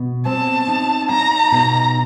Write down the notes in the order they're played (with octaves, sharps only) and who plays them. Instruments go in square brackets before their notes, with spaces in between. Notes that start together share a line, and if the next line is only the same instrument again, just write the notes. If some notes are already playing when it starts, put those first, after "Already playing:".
Already playing: [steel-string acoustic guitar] B2
[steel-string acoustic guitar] C4 [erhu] A5
[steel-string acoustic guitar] D#4
[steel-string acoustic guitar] D#4 [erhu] A#5
[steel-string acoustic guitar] B2